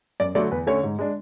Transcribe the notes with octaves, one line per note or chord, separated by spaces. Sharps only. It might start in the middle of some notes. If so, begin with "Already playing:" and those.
F#2 D5
D3 F#3 A3 D5
E2 B4
D3 A3 C#4 C#5
G#2
G#3 D4